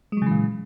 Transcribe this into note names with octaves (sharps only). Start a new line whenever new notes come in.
A#2 C#3 E3 F#3 G#3